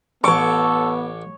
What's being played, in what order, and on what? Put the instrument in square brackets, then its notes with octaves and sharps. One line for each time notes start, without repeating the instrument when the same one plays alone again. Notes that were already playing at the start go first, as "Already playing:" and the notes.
[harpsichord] A1 D6 [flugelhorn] B3 [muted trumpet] A4 [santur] C#5 C#6